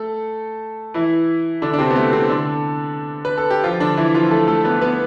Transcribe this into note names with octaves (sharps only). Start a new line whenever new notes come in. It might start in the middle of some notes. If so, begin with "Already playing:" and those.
Already playing: A3 A4
E3 E4
D3 D4
D4
C3 C4
B3
A3
C3 C4
D3 D4
B4
A4
G4
F3 F4
D3 D4
E3 E4
F3 F4
A3 A4
A3 A4
B3 B4
B3 B4